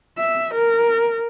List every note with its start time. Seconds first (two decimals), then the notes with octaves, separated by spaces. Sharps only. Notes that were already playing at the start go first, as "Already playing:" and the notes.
0.18 E5
0.54 A#4